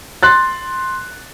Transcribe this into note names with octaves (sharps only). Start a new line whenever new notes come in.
C6 F#6 A6